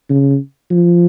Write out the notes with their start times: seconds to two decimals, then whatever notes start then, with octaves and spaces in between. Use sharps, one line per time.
0.10 C#3
0.71 F3